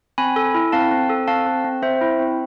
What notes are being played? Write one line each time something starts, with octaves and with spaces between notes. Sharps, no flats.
C4 G#5 B5
A4
E4
C4 F5 A5
C4
A4
C4 F5 A5
C4
C4
C4 C5 E5
E4
C4